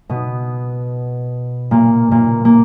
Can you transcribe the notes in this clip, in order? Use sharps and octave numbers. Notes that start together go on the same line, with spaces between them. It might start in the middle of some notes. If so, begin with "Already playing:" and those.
B2 B3
A#2 A#3
A#2 A#3
A#3